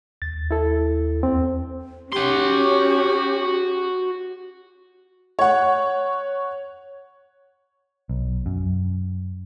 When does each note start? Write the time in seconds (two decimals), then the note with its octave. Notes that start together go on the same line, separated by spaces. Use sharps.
0.22 D#2 A6
0.51 E4 A4
1.23 E2 C4
2.12 C#4 F#4 G4 C6
5.39 C#5 F#5
8.09 B1
8.46 F#2